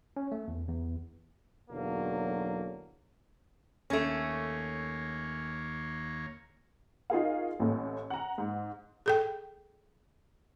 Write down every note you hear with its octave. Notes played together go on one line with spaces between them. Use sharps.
C#4
A3
E2
E2
B1 E2 D3 F#3 A#3
D#2 A3 A#3 C#4 C#5
D#4 F4 F#4 G#4 A#4 F5
A1 A2
F#5 A#5
G#2
G#4 A4 G5